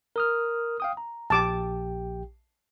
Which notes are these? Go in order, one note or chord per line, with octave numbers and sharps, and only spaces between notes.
A#4 D#6 F6
F5 G5 D#6
A#5
A#1 G4 G5 A5 D6